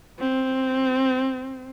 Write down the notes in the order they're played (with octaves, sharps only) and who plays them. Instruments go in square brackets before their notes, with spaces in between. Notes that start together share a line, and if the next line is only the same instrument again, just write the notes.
[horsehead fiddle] C4